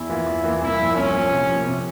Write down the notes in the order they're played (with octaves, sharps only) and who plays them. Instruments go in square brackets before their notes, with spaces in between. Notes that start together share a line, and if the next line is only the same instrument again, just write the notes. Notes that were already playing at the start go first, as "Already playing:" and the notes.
Already playing: [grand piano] E2 [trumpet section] E4
[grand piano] E3 A#3 F4
E2
E3 A#3 F4
[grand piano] C2 [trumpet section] E4
[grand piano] A#2 F3
[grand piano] C2 [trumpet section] C#4
[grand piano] A#2 F3
C3
F3 A#3
C3